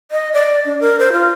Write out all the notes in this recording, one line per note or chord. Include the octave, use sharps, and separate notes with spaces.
D#5
D5
D4
A#4
C5
F4